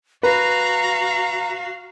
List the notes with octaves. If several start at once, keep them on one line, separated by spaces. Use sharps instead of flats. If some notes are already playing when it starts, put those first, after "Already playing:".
F#4 B4 F5 A#5